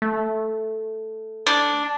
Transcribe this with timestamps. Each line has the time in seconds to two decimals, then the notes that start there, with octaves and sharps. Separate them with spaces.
0.02 A3
1.47 D4